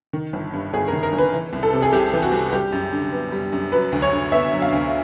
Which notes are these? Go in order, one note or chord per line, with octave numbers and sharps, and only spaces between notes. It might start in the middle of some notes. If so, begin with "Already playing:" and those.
D#3
G1
G2
G1 G#4
A#4
D#3
A#4
G1
B4
E3
C2
A4
C3
G#4
C2 G4
E3
F#4
C2
G3 G4
F#2
D3
B3
G3
F#2
F#3 B4
D2
C#5
D3
B3 E5
F#3
F5
D2